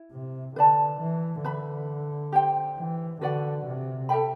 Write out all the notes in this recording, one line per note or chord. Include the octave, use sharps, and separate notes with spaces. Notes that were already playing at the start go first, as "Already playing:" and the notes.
Already playing: E4
C3
D3 B4 D5 A5
E3
D3 B4 E5 B5
G4 C5 G5
E3
D3 F#4 B4 D5 F#5
C3
A4 E5 G5 B5